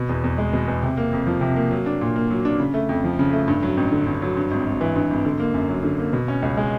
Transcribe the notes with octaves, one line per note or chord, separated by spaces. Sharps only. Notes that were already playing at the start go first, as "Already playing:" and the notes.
Already playing: B2
E2
E2
G#3
B2
E2
C3
A#3
F2
F3
C3
A#3
F#3
D4
A#2
A#3
F#3
D4
C#3
A3
F2
F3
C#3
A3
G2
F#3
A1
D3
G2
F#3
G2
G#1
G#1
E3
G2
G#1
D3
A#3
F#2
F#3
D3
A#3
B2
C#4
C#2
G#3